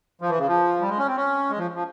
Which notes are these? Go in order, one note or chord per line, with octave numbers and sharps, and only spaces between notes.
F3
E3
C#3
F3
G3
G#3
C#4
C4
C#4
G#3
F3
F3